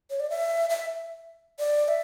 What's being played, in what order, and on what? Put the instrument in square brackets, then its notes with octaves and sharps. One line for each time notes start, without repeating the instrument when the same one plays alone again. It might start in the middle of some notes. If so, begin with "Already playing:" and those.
[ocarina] C#5
D5
E5
E5
D5
E5